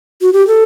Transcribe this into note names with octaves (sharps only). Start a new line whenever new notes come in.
F#4
G4
A4